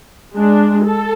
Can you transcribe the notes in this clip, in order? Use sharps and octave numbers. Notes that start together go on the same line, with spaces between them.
G#3 D4
A4